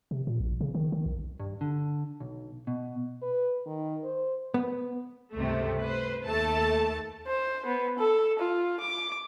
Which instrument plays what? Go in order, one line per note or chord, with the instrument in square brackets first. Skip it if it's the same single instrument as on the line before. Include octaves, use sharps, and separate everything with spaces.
[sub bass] C3
A#2
A#1
C#3
D#3
D#3
B1
[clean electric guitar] G2
D3
B1
B2
[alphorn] B4
D#3
C5
[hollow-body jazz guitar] B3
[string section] C#2 G2 C3 A3
B4 C5
D#2 A3 A4 A5
[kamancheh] C5
B3
A4
F4
D6